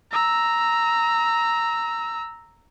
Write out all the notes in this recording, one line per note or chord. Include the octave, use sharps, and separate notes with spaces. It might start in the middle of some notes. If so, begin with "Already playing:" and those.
A#5 E6